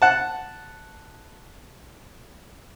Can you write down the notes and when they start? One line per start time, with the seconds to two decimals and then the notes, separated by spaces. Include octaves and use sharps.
0.02 F#5 A5